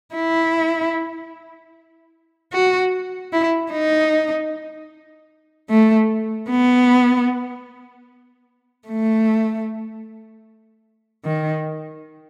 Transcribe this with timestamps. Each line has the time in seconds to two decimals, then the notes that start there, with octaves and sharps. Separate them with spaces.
0.15 E4
2.53 F#4
3.33 E4
3.72 D#4
5.70 A3
6.50 B3
8.88 A3
11.25 D#3